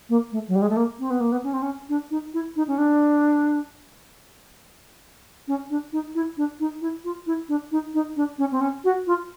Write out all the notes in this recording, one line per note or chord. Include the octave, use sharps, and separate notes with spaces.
A#3
A3
F#3
G3
G#3
A3
A#3
C4
B3
A#3
B3
C#4
C4
C#4
D4
D#4
E4
D#4
C#4
D4
C#4
D4
D#4
E4
D4
D#4
E4
F4
E4
D4
D#4
D#4
D4
C#4
C4
C#4
F#4
F4